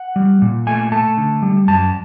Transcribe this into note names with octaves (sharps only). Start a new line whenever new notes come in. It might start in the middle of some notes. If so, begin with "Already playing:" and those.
Already playing: F#5
G3
A#2
A3 G#5
A3 A5
D3
G3
F#2 A5